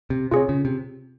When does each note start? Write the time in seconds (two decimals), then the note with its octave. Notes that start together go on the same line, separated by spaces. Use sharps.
0.10 C3
0.31 C3 F4 G#4 C#5
0.49 C#3
0.65 C3